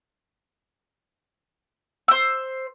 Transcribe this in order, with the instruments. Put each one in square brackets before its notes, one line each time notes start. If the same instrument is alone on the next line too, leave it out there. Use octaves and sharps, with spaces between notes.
[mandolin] C5 E6